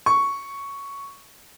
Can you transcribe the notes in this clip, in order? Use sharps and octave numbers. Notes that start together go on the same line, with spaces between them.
C#6